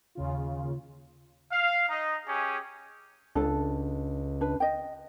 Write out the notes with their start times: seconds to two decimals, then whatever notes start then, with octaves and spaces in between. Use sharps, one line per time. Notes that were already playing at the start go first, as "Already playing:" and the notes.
0.15 D#2 C#3 F4
1.52 F5
1.89 D#4 D#5 A#5
2.27 C#4 G4 G#4
3.35 C#2 D4 A4
4.41 D4 B4
4.60 D#5 G5